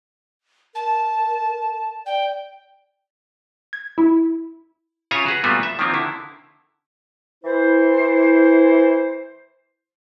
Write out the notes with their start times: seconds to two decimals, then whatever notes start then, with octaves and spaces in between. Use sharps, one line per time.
0.75 A#4 A5
2.06 D5 G5
3.73 G#6
3.98 E4
5.11 C#3 F4 C#5 E5 G#5 A#5
5.26 F#4 G#4 B4
5.44 A#2 G3 A3 B3 F4 F#4
5.63 E5
5.79 D#3 F3 A#3 C4 D4 F4
5.94 D3 D#3 E4
7.44 E3 E4 C5